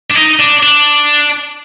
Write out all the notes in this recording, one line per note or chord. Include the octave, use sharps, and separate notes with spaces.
D4
D#4
D4
D4